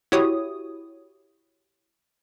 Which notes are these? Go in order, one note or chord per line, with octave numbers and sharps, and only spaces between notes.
E4 F#4 G4 C#5 D#6